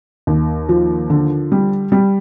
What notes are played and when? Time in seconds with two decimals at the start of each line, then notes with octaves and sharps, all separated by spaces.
0.27 D#2
0.69 F3
1.10 D3
1.52 G3
1.92 G3